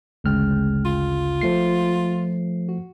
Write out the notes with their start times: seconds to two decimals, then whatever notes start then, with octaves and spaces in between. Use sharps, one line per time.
0.24 G#1 D2 C#3 G#3 G5 F6
0.85 F4
1.41 F3 A3 C7
2.69 F#4